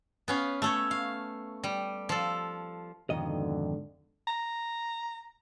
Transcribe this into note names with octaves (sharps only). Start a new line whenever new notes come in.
B3 C#4 F5
A3 A4 C#5
F5
G3
F3 A4
F2 G#2 B2 D3 D#3 D#5
A#5